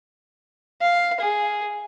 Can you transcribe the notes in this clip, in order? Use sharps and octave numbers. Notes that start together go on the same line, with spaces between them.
F5
G#4